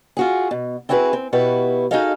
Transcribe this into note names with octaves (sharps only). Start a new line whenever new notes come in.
F4 F#4 G#4
B2
C4 E4 F#4 G#4 A#4 B4
C4
B2 E4 F#4 G4 B4
D#4 F#4 G#4 A4 D#5 F5